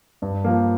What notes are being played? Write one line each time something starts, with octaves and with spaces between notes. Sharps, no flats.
G2
F3 A#3